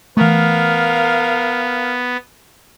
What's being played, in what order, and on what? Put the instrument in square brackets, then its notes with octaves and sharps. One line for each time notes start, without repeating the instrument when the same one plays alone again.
[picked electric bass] E3 A3 [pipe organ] B3 [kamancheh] A#4 F5